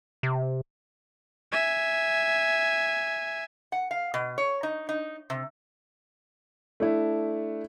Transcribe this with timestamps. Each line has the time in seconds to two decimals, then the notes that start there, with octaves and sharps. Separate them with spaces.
0.23 C3
1.52 E5 G#5
3.72 F#5
3.91 F5
4.14 B2
4.38 C#5
4.63 D#4
4.89 D#4
5.30 C3
6.80 A3 D4 E4